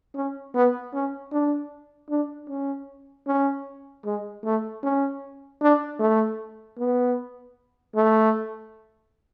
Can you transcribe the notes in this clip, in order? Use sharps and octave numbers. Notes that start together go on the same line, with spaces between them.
C#4
B3
C#4
D4
D4
C#4
C#4
G#3
A3
C#4
D4
A3
B3
A3